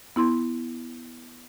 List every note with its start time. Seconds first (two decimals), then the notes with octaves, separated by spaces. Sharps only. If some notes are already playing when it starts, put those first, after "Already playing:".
0.16 B3 E4 C6